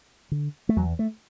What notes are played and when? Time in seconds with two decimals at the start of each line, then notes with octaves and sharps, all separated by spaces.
0.31 D3
0.69 A3
0.77 E2 F#3
0.99 A3